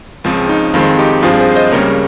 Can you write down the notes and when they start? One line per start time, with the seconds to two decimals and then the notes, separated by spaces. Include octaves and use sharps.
0.24 C#2 C#3 F3 C4
0.49 D#4
0.74 F2 D#3 G#3 C4 F4
0.99 D#4 G4
1.23 G2 F3 C4 F4 G#4
1.39 G#4 C5
1.55 C5 D#5
1.72 C#2 C#3 G3 A#3 A#4 C#5